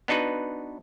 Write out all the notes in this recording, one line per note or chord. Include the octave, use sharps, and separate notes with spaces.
B3 D4 D#4 F#4 B4